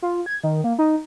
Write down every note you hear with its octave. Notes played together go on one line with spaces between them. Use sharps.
F4
G#6
D#3
A#3
D#4